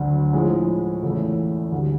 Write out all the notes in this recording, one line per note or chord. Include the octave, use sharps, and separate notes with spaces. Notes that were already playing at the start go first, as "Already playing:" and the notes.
Already playing: D2 D3 F#3
A2 F3 G#3
E2 C#3 E3 A3
D2 D3 G3